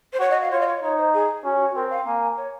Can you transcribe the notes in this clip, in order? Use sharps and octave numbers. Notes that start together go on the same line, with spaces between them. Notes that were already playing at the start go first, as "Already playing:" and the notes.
C5
F#4 C#5
D#5
F5
F4 C#5
D#5
C#5
D#4 C#5
C5
G#4
C#4 F#4
F#4
C4 A#4
F5
A#3 G#5
C#5